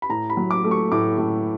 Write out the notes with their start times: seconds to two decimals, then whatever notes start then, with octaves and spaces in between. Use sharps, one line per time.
0.02 B5
0.09 A2 A#5
0.30 B5
0.37 F#3
0.51 D6
0.64 A3
0.71 C#6
0.92 A2 D6
1.18 A2